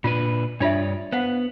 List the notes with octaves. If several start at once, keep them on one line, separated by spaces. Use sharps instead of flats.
A#2 D4 F4 B4
G2 D4 F4 C#5 D5 E5
B3 C5 F5 F#5